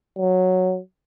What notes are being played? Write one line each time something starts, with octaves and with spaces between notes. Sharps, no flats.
F#3